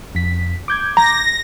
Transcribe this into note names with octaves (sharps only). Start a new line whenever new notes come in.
F2 B6
D6 G6 G#6
A#5 A#6